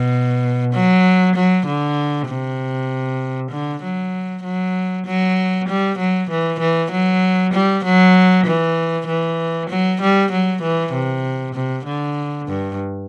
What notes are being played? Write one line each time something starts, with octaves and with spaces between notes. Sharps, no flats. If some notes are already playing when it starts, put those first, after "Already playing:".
Already playing: B2
F#3
F#3
D3
C3
D3
F#3
F#3
F#3
G3
F#3
E3
E3
F#3
G3
F#3
E3
E3
F#3
G3
F#3
E3
C3
C3
D3
G2